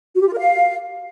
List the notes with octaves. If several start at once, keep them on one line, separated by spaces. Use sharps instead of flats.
F#4
G4
F4
A#4
F5